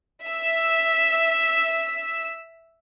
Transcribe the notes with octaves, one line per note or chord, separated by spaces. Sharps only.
E5 E6